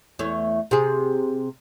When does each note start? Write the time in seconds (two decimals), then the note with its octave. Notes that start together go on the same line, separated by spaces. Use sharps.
0.19 E2 A3 C#5
0.71 C3 G#4